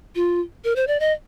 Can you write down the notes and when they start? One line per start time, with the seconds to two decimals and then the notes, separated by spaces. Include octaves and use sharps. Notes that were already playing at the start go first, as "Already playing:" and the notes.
0.15 F4
0.64 A#4
0.76 C5
0.87 D5
1.00 D#5